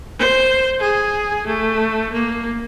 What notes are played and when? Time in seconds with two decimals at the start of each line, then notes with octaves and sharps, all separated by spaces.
0.19 C5
0.80 G#4
1.47 A3
2.13 A#3